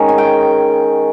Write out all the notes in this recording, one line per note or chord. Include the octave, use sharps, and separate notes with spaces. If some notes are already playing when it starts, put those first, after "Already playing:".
Already playing: D#3 G#3 C#4
G#5
G5